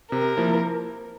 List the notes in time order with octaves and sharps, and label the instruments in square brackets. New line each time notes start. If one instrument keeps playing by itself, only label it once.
[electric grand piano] C3 [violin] A#4
[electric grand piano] F3 A#3 E4